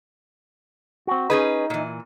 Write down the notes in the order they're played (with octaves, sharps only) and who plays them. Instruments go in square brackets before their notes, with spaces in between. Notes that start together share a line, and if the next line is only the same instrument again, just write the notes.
[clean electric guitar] C4 F#4
[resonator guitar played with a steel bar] C#4 G#4 B4 [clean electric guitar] D#4
[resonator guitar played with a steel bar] A#2 E3